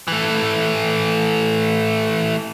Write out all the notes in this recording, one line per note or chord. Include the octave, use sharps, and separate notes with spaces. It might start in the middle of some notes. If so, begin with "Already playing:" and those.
E3 A3